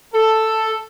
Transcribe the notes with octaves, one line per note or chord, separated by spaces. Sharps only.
A4